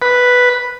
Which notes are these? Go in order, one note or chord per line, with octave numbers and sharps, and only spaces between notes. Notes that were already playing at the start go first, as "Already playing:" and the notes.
B4